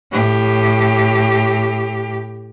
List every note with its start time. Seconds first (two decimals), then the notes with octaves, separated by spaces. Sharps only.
0.12 A2 G4